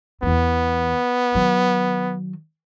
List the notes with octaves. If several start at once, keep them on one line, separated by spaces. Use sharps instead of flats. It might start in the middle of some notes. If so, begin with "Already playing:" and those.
E2 E3 B3
D#3 F#3